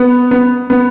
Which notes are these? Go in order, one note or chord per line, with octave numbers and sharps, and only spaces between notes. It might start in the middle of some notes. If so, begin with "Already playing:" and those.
Already playing: B3
B3
B3